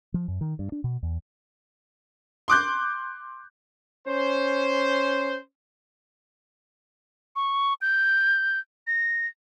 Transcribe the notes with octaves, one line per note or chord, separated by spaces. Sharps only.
F3
F#2
D#3
G2
D4
B2
E2
C6 D6 F#6 G6
C#4 C5
C#6
G6
A#6